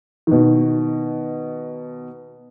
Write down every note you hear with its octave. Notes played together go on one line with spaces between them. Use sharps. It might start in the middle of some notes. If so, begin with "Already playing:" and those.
B2 D#3